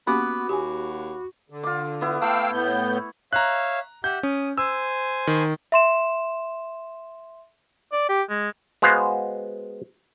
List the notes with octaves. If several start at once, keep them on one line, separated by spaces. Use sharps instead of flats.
A#3 B3 C#4 F#4 G4 B5 D6
D#2 G4 G#5
D3
F4 D6
B3 E4
A3 F5 G5 E6
A2 B3 G6
C#5 E5 F5 A#5 F#6
G4 E5 F#5 G6
C#4 D#6
C5 G#5 E6
D#3
E5 C6 E7
D5
G4
G#3
G#3 B3 F#4 C5 F5